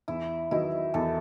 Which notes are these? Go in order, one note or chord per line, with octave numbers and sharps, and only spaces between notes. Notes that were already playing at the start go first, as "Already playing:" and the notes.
E2 E4
D#3 F#3 B3 D#4 E4
E2 A4